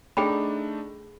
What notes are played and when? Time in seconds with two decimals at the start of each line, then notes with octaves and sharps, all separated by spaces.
0.17 A3 D4 D#4 G#4 G5 B5